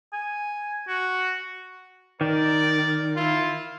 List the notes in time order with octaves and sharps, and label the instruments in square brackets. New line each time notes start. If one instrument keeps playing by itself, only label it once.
[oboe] G#5
F#4
[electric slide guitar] D#3 [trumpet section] A#4 D5
[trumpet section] E4 F4